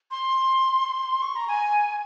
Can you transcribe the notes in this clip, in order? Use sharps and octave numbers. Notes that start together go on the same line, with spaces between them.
C6
C#6
A#5
G#5